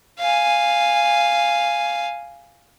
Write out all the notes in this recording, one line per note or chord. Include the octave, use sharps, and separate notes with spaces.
F5 G#5